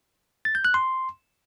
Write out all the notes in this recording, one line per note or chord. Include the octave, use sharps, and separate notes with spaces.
A6
G6
F#6
C6